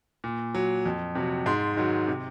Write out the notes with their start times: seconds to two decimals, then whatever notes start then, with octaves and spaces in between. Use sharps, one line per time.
0.24 A#2
0.55 F#3
0.86 F2
1.15 C3 F#3
1.46 G#2 C6
1.77 D#3 F#3
2.07 C3